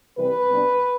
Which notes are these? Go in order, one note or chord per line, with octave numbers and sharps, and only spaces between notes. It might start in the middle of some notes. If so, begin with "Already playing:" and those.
C3 E3 G3 C4 B4
C3 G3 B3 D4